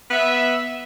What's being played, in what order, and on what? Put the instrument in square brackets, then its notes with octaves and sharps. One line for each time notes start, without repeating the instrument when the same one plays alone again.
[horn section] B3 E5